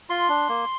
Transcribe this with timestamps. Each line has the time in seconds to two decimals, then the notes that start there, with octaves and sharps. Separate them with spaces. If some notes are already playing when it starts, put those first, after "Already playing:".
0.10 F4 C6
0.29 D4
0.49 A#3